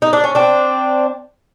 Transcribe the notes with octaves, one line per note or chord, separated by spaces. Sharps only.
D#4
D4
C#4
C4 D4